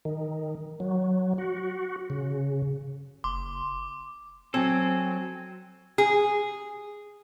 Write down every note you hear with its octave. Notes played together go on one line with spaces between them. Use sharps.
D#3
F#3
F#4
C#3
F#1 C6 D6
F#3 C4 A4 G#5
G#4